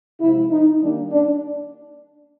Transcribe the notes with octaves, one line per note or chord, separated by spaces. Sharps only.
C3 F3 G#3 E4
D#4
D#3 G3 A#3 D4
D4